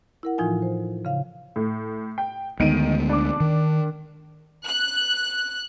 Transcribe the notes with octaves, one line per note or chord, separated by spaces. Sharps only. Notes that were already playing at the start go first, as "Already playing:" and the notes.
E4 A#4 F#5
A2 E3 F3 D#4 F4 G#5
C5
C#3 F5
A2
G5
D2 D#3 G#3 B3 D7 D#7
D4 D6
D#3
F#6